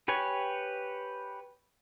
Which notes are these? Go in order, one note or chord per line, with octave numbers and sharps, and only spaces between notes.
G4 B4 C#5 G#5